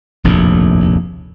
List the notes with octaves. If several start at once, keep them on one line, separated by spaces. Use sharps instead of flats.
F1 A#1 D#2 A2